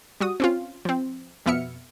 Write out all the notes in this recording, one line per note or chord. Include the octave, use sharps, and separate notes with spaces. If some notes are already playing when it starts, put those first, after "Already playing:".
G3 F#4 D#6
C4 C#4 F4
F3 C4
F2 B2 B3 E5 F6 C#7